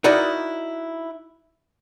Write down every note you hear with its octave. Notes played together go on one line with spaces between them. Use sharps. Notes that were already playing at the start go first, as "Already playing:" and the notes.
D#4 E4 F#4 A#4 D5 D#5